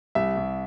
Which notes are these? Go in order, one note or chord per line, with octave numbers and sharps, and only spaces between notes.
C2 E5
C2